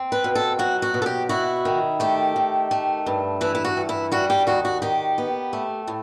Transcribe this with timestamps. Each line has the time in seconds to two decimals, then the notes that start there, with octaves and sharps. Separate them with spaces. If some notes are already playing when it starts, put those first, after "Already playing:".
Already playing: C4
0.12 B4
0.24 B2
0.35 A4
0.59 F#3 F#4
0.82 F#4
0.94 B2
1.02 A4
1.06 G4
1.29 E4 F#4
1.65 D#3
2.00 A3 G4
2.36 D#3
2.71 A3
3.06 G2
3.41 E3 E4
3.55 E4
3.65 F#4
3.77 G2
3.89 E4
4.12 G3 F#4
4.30 G4
4.47 D#2 F#4
4.65 F#4
4.82 D#3 G4
5.18 B3
5.53 A3
5.88 A2